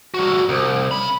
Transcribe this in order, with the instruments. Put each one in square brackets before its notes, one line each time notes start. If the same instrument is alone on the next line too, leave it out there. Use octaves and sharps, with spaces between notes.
[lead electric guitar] G3 F#4
C2
C#3 B5